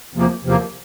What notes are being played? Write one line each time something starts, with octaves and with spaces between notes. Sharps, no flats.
E2 C3 F3 A#3
E2 C3 F3 A#3